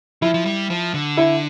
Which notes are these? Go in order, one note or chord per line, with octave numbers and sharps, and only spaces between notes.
F3 E4
F3
G3
F3
D3
E4